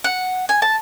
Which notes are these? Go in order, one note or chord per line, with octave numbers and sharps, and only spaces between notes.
F#5
G#5
A5